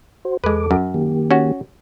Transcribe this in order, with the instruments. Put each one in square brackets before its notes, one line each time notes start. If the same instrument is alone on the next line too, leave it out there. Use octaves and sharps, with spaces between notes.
[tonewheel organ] F#4 C5
[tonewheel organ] E2 A4 D6 [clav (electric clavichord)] G#3 B4
[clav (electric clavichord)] F#2
[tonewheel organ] D#3 A#3 G4
[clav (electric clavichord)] C#4 F#4